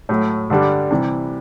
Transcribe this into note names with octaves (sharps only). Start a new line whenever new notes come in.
A2 F#3 A3
G2 D3 G3 D4
C3 E3 G3